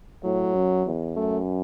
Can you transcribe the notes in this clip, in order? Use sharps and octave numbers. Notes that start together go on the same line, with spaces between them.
A2 F#3
F#2
E2
F#2 A3